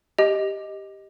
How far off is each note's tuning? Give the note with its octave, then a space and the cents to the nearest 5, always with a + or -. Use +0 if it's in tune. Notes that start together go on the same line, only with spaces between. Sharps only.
G4 +0 D#5 +0